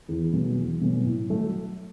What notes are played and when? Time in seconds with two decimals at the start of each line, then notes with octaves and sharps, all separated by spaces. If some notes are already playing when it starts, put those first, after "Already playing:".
0.09 E2
0.33 B2 F#3 A3 C#4
0.57 E2
0.81 B2 F#3 A3 C#4
1.05 A2
1.30 F#3 A3